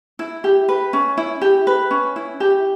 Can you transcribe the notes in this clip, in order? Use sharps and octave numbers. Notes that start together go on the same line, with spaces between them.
E4
G4
B4
C#4
E4
G4
B4
C#4
E4
G4